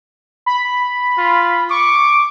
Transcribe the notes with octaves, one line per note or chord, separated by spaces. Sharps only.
B5
F4
C#6 D6